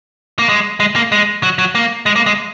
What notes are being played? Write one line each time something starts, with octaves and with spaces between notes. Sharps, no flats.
A#3
G#3
G#3
A#3
G#3
F#3
F#3
A#3
G#3
A#3
G#3